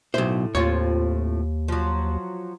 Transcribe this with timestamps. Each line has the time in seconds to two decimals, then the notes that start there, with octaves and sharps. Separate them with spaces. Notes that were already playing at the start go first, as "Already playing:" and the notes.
0.14 B1 A2 E4 C5
0.55 D#2 A2 C4 F4 C#5
1.68 F3 F#3